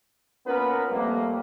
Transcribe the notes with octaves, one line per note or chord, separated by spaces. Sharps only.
A#3 B3 C#4 F4 A#4 B4
F2 G3 A3 A#3